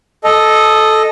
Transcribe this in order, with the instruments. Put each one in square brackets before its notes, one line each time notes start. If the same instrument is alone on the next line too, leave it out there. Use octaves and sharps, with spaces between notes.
[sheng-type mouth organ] A4 D#5